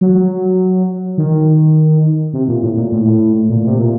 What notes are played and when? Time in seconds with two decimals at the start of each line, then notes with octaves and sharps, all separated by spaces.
0.01 F#3
1.18 D#3
2.33 C3
2.48 A#2
2.62 A2
2.77 A#2
2.92 A2
3.49 A#2
3.67 C3
3.79 A#2